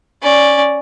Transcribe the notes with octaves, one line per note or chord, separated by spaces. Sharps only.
C#4 D5